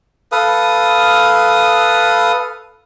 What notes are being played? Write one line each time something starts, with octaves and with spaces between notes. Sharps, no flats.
A4 B4 F5 D#6